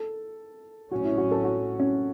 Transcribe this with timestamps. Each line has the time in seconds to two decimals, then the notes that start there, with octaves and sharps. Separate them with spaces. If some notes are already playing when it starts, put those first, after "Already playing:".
Already playing: A4
0.91 A1 A2 F#3 C#4 F#4
1.05 E4
1.18 F#4
1.31 A4
1.44 F#4
1.80 C#4